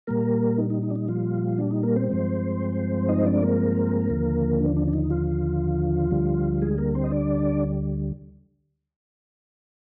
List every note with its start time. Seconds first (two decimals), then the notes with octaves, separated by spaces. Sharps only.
0.07 A#2 G3 A#3 A#4
0.58 D#4
0.70 D#4
0.83 D#4
0.90 D4
0.96 D#4
1.08 F3 F4
1.58 D4
1.71 D#4
1.83 A#3 A#4
1.96 C4 C5
2.09 G2 F3 G#3 C4
3.09 D#4 D#5
3.18 C5
3.26 D4 D5
3.43 A#3 A#4
4.10 D#2 D3 F3
4.61 D4
4.76 D4
4.87 D4
4.93 D#4
5.10 F3 F4
6.11 D2 D3 G3
6.61 G#3 G#4
6.78 A#3 A#4
6.95 C4 C5
7.04 D#5
7.11 D4 D5